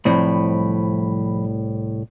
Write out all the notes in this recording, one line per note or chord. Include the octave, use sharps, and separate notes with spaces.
C2 A2 F3 C4 B5